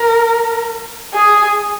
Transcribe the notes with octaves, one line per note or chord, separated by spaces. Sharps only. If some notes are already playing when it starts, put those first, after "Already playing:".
Already playing: A#4
G#4